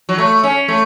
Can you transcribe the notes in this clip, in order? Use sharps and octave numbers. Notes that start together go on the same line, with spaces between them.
F#3
A3
C#4
A3